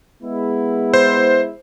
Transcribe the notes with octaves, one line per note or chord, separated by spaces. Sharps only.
G#3 B3 E4
C5